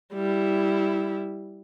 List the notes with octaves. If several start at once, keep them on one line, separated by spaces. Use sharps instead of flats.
G3 E4